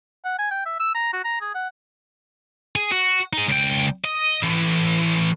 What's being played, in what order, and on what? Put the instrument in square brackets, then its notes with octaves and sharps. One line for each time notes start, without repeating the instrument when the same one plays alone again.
[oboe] F#5
G#5
G5
E5
E6
A#5
F#4
A#5
G#4
F#5
[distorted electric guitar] G#4
F#4
D#4 G#4
C#2 G5
D#5
A2 E3